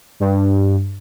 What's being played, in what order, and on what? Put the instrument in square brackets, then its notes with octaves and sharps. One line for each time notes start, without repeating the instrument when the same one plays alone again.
[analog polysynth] G2